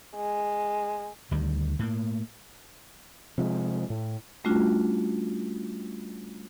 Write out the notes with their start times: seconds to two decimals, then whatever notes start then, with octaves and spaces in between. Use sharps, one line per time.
0.16 G#3
1.31 D2 D#3 G3
1.79 A2 A#3
3.38 C3 F3 G#3
3.90 A2
4.44 G3 A3 C#4 D4 F4 F#4